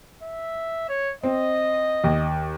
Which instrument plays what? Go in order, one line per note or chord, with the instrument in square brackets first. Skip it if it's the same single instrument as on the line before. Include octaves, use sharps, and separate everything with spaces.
[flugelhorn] E5
C#5
[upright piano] C4 [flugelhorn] D#5
[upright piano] D#2